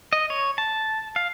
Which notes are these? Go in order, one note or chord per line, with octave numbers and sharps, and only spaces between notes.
D#5
C#5
A5
F5